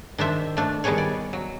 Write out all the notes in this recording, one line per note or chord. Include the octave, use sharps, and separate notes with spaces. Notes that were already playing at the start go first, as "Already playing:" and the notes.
D#3 D4 C5 E5
A3 D4
D#3 G3 B3 G#4 C#5
D5
F#3